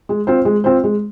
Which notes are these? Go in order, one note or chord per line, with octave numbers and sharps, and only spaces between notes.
G#3
C4 F4 C5
G#3
C4 F4 C5
G#3